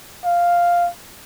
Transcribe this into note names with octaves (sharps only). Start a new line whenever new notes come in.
F5